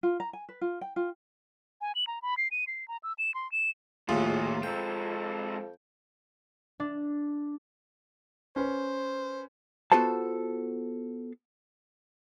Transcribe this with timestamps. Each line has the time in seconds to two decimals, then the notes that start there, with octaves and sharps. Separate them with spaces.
0.03 F4
0.20 A#5
0.33 G#5
0.49 B4
0.61 F4
0.81 G5
0.96 F4
1.81 G#5
1.95 F#7
2.07 A#5
2.22 B5
2.37 C7
2.51 D#7
2.67 C7
2.88 A#5
3.03 E6
3.18 E7
3.34 C6
3.52 E7
4.09 A#1 D#2 A2 G3 F4 F#4 G#4
4.63 F2 G#3 C4 G5
6.80 D4
8.56 C#4 B4 C5
9.92 B3 F4 F#4 A4 C5 A5